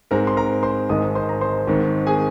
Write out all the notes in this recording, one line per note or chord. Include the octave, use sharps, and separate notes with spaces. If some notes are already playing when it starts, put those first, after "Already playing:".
G#2 G#3 C4 A#4 A#5
C6
A#4 A#5
C5 C6
G#1 G#2 G#3 D#5 D#6
C5 C6
A#5
C5 C6
G#1 G#2 D#3 C4
G#4 G#5